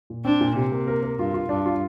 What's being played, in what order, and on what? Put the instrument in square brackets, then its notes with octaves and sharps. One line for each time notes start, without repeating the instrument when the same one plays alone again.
[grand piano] A#2
[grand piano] C4 [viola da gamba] D4
[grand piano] A#2
[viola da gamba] C3 [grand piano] G4
[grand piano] A#3
A#4
A#4
[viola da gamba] G2 [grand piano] F4
[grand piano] F4
[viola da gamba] G2 [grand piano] D4
[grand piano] F4